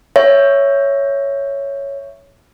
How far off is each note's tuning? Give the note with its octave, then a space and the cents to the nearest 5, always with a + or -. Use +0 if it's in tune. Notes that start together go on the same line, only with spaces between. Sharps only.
C#5 +0 E5 +10